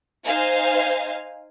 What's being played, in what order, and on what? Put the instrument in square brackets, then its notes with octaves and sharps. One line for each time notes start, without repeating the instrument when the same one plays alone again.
[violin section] D#4 C5 F5 G#5